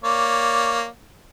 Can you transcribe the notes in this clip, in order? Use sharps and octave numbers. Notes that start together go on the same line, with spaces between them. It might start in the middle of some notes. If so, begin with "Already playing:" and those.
A#3 C#5 D5